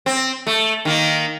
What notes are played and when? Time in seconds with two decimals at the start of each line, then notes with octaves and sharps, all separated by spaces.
0.06 C4
0.47 A3
0.85 D#3 A#3